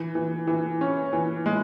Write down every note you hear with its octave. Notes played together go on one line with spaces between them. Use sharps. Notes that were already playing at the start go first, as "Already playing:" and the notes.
Already playing: E3
E3
E3
C#4
E3
G#3